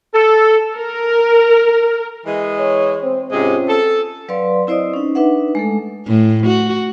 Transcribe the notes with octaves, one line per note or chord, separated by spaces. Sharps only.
A4
A#4
E3 G#3
C#5
C4
G#2 C3 G#3 C4 C#4 F4
A4
F#3 B4 D5 F5 C6
C4 E4 C5 D5 D#5 D#6
C#4 D#4
D4 D#4 B4 E5 F#5
G#3 A3 A4
A2
F#4